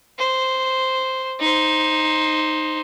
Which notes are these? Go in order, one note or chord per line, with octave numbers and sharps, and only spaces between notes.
C5
D#4 C5